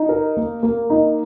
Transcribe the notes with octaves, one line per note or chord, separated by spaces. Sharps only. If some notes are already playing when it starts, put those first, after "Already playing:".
Already playing: D#4
A#4
A#3
A#3
D#4